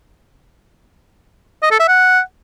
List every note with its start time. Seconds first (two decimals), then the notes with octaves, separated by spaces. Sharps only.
1.63 D#5
1.71 A4
1.80 E5
1.88 F#5